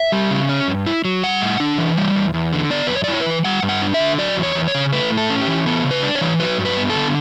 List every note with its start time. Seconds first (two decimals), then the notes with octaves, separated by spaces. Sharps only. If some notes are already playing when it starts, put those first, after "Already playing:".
Already playing: E5
0.12 G3
0.31 C#3
0.49 C#4
0.68 G2
0.86 E4
1.05 F#3
1.23 G3 F#5
1.42 A2
1.60 D4
1.78 E3
1.97 G3
2.15 E2
2.34 E2
2.53 D3
2.70 B3 D5
2.87 F#2 B4
2.96 C#5
3.04 D5
3.08 E4 C#5
3.20 B4
3.26 E3
3.45 G3 F#5
3.63 G2
3.69 F#5
3.82 D4
3.94 E5
4.00 D3
4.18 F#3 D5
4.37 E2
4.43 C#5
4.55 E2
4.68 C#5
4.74 C#3
4.92 A3 B4
5.10 A2
5.17 A4
5.30 C#4
5.41 G4
5.48 E3
5.66 B3 A4
5.84 C#3
5.91 B4
6.03 D4
6.15 C#5
6.21 E3
6.40 F#3 B4
6.58 G2
6.65 B4
6.77 B3
6.90 A4
6.95 D3